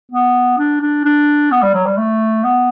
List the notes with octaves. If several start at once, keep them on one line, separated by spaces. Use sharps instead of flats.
B3
D4
D4
D4
B3
G3
F#3
G3
A3
B3